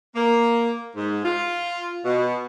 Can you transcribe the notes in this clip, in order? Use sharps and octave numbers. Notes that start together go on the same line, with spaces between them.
A#3
G#2
F4
B2